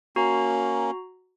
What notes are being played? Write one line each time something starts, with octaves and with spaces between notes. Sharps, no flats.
A#3 C#4 F#4 A#5